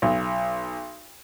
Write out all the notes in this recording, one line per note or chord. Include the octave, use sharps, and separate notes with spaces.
B1